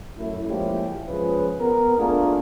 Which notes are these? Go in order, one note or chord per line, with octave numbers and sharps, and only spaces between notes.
F#2 A3 E4
F3 G#3 A#3 C#4 E4 G4
C#2 F3 C#4 G#4 B4
B3 A#4
A3 A#3 D4 F4 G#4 A#4